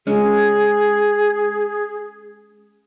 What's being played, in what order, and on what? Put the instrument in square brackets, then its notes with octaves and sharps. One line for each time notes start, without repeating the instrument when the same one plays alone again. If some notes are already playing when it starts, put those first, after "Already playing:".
[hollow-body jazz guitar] G#3 C#4 [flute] G#4